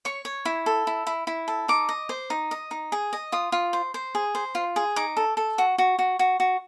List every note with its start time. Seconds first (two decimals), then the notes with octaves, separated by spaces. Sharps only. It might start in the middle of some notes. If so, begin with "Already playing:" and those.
0.05 C#5 C#6
0.25 C#5
0.45 E4
0.66 A4
0.87 E4
1.07 E4
1.27 E4
1.48 A4
1.68 D#4 D6
1.89 D#5
2.09 C5
2.30 D#4
2.51 D#5
2.71 D#4
2.92 G#4
3.13 D#5
3.32 F4 D#6
3.52 F4
3.73 C5
3.94 C5
4.15 G#4
4.35 C5
4.55 F4
4.76 G#4
4.96 D#4 D6
5.17 A4
5.37 A4
5.58 F#4
5.78 F#4
5.99 F#4
6.19 F#4
6.40 F#4